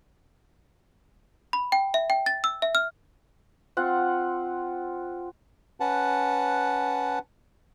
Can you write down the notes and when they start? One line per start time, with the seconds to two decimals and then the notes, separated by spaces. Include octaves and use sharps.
1.53 B5
1.72 G5
1.94 E5
2.10 G5
2.26 A6
2.44 E6
2.62 E5
2.75 F6
3.77 C4 F4 F#5
5.80 C#4 B4 F#5 A5